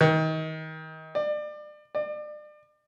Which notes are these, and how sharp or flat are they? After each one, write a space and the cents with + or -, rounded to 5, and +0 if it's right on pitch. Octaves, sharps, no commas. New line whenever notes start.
D#3 +30
D5 +30
D5 +35